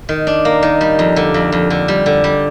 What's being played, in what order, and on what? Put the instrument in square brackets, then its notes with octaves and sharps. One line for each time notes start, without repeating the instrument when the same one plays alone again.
[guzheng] D#3
D4
A#3
D#3
G3
F2
D3
F2
F2
D3
G3
D3
G3